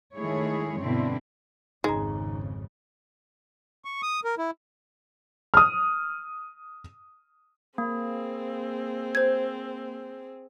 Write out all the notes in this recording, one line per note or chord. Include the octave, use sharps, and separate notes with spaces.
D#3 G#3 A3 E4 G#4 C#5
G2 B2 D3 C4 E4
G#1 F2 C#3 G#3 D#4 A#5
C#6
D#6
A#4
E4
D#6 F6
A#3 C4 G#4
C5 G#6